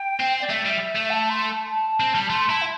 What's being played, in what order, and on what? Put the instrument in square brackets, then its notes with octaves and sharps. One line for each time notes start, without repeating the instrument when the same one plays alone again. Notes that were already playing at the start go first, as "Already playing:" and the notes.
Already playing: [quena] G5
[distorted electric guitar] C4
[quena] D5
[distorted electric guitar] A3 [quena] E5
[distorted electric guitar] G3
A3
[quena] A5
C6
A5
A5
[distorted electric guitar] C4
G3
[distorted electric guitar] A3 [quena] C6
[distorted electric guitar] E4 [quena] A5
[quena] E5